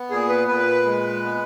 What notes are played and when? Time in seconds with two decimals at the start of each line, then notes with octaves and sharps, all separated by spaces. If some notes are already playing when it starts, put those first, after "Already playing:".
Already playing: B3
0.10 A#2 G#4
0.29 B4
0.48 A#2 B4
0.85 G#3
1.24 B3